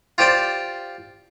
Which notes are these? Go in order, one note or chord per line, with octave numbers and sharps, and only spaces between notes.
F4 G4 C5 D5 G5